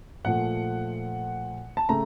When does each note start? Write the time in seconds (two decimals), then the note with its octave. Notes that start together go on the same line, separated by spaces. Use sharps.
0.24 A#2 F3 A3 F#5
1.77 A5
1.89 C#3 A3 A#5